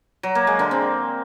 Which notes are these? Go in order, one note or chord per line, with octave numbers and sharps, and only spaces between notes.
F#3
A#3
G#3
D3
C4